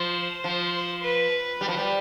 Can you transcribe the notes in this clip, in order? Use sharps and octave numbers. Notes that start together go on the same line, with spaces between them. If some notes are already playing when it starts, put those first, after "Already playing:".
Already playing: F3 C5
F3
B4
G3
F3
G3